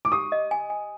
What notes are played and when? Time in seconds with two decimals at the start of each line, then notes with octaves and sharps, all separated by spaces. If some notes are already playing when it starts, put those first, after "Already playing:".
0.05 D6
0.12 G4 D#6
0.32 D#5
0.51 G#5
0.70 G#5